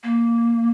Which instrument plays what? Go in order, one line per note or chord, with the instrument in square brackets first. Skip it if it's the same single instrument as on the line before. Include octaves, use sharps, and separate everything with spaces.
[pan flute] A#3